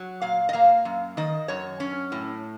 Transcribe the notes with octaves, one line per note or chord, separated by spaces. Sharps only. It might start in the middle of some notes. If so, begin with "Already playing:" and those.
Already playing: F#3
A#2 F5
D#5
A#3 F5
F#2
D#3 D#5
F#2 C#5
C#4
A2